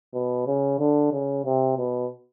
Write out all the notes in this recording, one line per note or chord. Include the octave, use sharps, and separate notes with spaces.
B2
C#3
D3
C#3
C3
B2